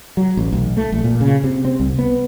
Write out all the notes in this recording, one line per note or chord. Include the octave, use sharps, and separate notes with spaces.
F#3
A1
B1
A3
A#1
A#2
C#3
C3
C4
C2
B3